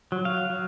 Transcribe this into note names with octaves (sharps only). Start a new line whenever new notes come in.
F#3
F5
F#3